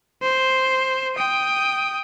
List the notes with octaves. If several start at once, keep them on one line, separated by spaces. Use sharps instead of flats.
C5
G5 D#6